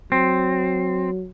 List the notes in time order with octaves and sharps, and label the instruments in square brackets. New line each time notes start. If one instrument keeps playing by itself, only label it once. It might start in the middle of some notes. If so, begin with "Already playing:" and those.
[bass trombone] F#3 [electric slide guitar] C4